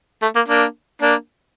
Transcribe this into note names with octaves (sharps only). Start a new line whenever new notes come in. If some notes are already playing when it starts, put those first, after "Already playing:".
A3
A#3
A#3 D4
A#3 D4